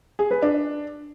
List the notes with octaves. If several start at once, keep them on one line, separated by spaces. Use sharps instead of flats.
G#4
B4
D4